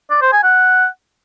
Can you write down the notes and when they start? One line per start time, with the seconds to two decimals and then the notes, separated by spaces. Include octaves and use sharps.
0.10 D5
0.21 C5
0.32 G#5
0.43 F#5